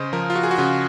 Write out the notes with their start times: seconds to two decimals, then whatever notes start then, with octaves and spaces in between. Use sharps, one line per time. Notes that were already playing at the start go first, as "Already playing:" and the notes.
Already playing: C#3 C5 D#5
0.13 F3 A#4
0.30 F4
0.35 F#4
0.43 G#4
0.51 F#4
0.58 C#3 F4